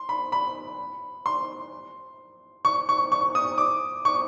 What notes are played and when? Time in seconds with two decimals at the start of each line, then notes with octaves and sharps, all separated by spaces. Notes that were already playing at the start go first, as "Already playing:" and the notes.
Already playing: C6
0.09 B5
0.32 B5
1.26 C6
2.65 C#6
2.89 C#6
3.12 C#6
3.35 D#6
3.58 D6
4.05 C#6